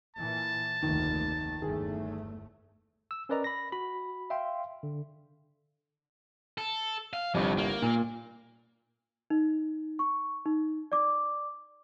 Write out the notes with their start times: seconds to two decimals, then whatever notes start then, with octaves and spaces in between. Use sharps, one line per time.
0.16 A#2 E3 A5
0.83 F1 D2 D#3 A#3
1.62 G1 E2 D#3 A3 G#4
3.11 E6
3.29 C#4 A#4 B4 D5 D#5 A#5
3.44 B5 A#6
3.72 F#4 B5
4.30 E5 F5 G5 C6
4.83 D3
6.58 A4
7.13 F5
7.34 G1 C2 F2
7.58 A#3
7.82 A#2
9.30 D#4
9.99 C#6
10.46 D#4
10.92 D5 D6